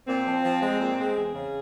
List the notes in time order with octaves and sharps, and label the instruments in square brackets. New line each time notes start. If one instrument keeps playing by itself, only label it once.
[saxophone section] A#2 C4
F3
F3
G#3
A#2
G#3
E2 G#4
C#3